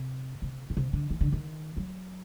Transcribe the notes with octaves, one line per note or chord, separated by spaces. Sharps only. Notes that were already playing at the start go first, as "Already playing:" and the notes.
Already playing: C3
C3
A#2
C3
D3
D#3
D3
D#3
F#3